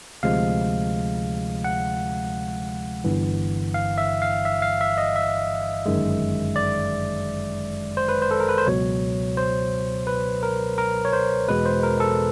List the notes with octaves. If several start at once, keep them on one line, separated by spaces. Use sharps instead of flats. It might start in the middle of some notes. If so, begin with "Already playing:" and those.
D2 C3 F3 G#3 F5
F#5
G1 G2 E3
F5
E5
F5
E5
F5
E5
D#5
E5
G1 F#2 D#3 G#3
D5
C5
B4
C5
A4
A#4
B4
C5
C#2 B2 F#3 C#5
C5
B4
A#4
A#4
C#5
C5
E2 B2 G#3 B4
C5
A#4
A4